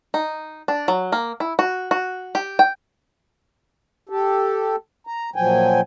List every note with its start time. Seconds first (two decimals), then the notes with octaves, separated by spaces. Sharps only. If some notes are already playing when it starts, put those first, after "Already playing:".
0.14 D#4
0.68 D4
0.88 F#3
1.12 A#3
1.40 E4
1.59 F#4
1.91 F#4
2.35 G4
2.59 G5
4.09 G4 A4
5.07 A#5
5.36 A#2 F3 F#3 G5 G#5